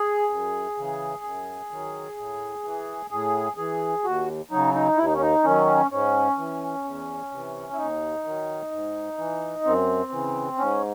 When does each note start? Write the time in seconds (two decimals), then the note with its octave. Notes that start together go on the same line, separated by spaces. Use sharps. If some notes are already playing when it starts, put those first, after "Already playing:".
Already playing: G#4
0.30 F#2
0.77 C#3 E3
1.24 F#2
1.71 D#3 F#3
2.17 A2
2.64 E3
3.10 A2 G#4
3.57 E3 G#4
4.04 D#2 F#4
4.51 C#3 F#3 D#4
4.74 D#4
4.97 D#2 E4
5.06 D#4
5.14 C#4
5.21 D#4
5.44 D#3 F#3 C#4
5.91 G#2 C#4
6.38 E3
6.84 E2
7.31 C3 E3
7.73 E4
7.77 D#2 D#4
8.24 D#3 F#3
8.71 G#2
9.18 E3
9.65 F#2 C4
10.11 C#3 E3
10.58 G#2 C#4